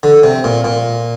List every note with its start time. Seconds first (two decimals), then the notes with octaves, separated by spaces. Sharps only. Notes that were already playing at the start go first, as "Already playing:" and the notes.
0.03 D3
0.23 C3
0.44 A#2
0.64 A#2